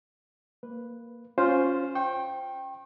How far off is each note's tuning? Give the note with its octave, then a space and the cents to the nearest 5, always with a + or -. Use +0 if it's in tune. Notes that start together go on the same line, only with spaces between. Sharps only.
A#3 +0 B4 +0
C#4 +0 F4 +10 C5 +0
G5 +0 C#6 -40